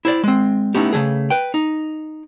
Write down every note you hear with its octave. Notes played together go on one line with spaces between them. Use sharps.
E4 C5 D5
G#3 C4
A3 B3 C#4 D#4 E4 G4
C#3 F#3 A3 G#4
B4 G5
D#4